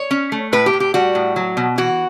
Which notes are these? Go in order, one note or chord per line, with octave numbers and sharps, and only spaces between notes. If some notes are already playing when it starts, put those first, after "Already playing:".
Already playing: C#5
C#4
A3
A2 B4
G4
A2
G4
G3 F#4
A2
F#3
B2
E3 F#4